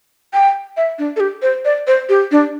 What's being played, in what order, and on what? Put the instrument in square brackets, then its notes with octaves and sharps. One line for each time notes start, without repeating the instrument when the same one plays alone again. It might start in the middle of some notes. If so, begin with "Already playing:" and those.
[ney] G5
E5
D4
A4
G4
C5
D5
C5
G4
D4